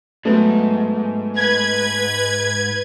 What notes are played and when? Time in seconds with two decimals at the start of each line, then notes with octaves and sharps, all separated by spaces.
0.25 G#2 F#3 A3 B3
1.36 B4 G#6